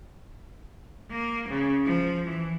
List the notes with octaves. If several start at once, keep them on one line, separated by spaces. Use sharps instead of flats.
A#3
C#3
F3
E3